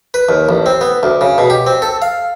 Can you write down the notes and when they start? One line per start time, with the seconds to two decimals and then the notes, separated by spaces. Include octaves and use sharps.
0.14 B4
0.29 D#2
0.49 A1
0.66 C4
0.81 B3
1.03 D2
1.21 C#3
1.38 B2
1.50 G4
1.66 C4
1.82 A4
2.02 F5